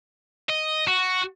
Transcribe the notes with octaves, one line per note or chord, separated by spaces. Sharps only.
D#5
F#4